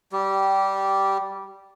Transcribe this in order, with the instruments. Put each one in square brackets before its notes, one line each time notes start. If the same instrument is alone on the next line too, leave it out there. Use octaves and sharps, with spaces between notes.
[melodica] G3 G4